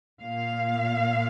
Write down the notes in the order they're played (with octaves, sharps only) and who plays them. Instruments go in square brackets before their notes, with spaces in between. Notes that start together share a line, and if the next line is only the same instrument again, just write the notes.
[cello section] A#2 A#3 F5